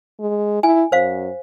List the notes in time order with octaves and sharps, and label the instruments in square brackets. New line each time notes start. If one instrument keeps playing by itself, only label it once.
[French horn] G#3
[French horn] E4 [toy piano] G#5
[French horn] F#2 [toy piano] C5 F5